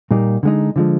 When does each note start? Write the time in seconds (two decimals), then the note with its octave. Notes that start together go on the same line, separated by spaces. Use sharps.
0.11 A#2 G3 A#3 D#4
0.43 D3 G#3 D#4
0.76 D3 F3 G#3